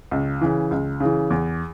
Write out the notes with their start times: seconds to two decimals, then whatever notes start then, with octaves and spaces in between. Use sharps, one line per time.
0.11 C#2
0.41 C#3 E3
0.71 C#2
1.00 C#3 E3
1.30 E2